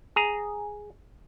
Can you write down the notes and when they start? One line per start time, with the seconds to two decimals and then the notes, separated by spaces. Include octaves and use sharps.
0.16 G#4 A#5